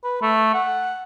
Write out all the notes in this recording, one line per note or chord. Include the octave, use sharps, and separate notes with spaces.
B4
A3
F#5